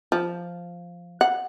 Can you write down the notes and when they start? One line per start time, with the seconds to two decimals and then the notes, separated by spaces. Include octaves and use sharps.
0.12 F3
1.21 F#5